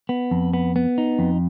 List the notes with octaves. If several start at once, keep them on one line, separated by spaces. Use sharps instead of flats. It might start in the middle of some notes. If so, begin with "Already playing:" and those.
B3
F2
B3
B3
D#4
F2